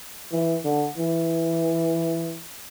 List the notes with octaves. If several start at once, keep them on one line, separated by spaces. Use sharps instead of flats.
E3
D3
E3